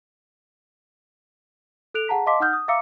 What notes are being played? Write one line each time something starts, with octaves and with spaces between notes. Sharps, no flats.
A4 F#6 D7 F7
G#4 F#5 A5 A#5 B6
D#5 F5 A5 C6 D6 B6
D#4 F#5 D#6 F6 G6
D#6
E5 F5 A#5 D6 E6 C#7